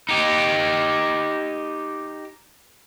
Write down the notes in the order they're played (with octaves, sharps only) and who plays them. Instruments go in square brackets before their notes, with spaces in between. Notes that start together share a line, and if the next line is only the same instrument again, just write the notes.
[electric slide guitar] D#4 G4